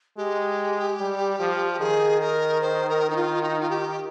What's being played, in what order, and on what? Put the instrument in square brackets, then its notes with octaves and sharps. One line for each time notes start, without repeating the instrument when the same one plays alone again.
[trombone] G#3 [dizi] G4
[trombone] G3
F3
[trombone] D#3 [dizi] G#4
[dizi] A#4
C5
A#4
D#4
F4
D#4
F4
G4